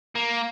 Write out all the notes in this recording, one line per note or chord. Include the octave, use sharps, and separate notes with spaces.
A#3